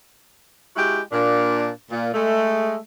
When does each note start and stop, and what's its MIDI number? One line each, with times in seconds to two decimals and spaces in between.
0.76 1.01 56
0.76 1.01 64
0.76 1.01 66
0.76 1.01 67
1.12 1.68 46
1.12 1.68 62
1.91 2.10 46
2.14 2.76 56
2.14 2.76 57